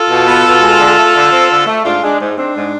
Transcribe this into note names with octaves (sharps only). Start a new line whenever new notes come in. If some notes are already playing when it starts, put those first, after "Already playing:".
Already playing: F4 A4
B2
B3
B2
G#3
D3
A3
D3
C4
D3
A3
G#2 D4 F4
G#3 D4
G#2
C4 D4
G#2